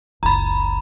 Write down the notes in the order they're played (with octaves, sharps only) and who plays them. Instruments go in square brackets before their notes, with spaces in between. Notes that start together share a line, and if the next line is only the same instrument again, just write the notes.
[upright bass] F#1 C#2 [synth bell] A#5 B5